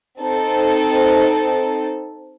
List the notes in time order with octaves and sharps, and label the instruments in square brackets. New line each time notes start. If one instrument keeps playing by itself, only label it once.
[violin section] C4 D#4 A4